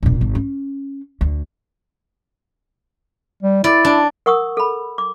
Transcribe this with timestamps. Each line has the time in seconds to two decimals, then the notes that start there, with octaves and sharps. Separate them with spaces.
0.03 E1 A#2
0.21 G#1
0.35 C#4
1.21 D2
3.43 G3
3.64 E4 D5
3.85 D4
4.26 A#4 F#5 C#6 D#6 E6
4.57 A4 B5
4.98 D6